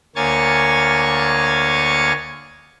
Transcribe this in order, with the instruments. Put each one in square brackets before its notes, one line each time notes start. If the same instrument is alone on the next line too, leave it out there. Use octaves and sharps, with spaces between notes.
[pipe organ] D2 A#3 C#5 G#5 C#6 A6